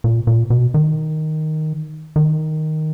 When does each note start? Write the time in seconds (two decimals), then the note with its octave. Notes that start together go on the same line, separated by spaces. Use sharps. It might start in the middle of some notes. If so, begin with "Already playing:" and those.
0.04 A#2
0.27 A#2
0.50 B2
0.74 D#3
2.16 D#3